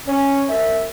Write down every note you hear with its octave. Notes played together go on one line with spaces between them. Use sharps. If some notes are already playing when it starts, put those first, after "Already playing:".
C#4
C2 E5